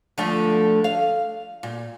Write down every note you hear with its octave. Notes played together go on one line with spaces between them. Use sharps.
D3 F3 A3
F5
A#2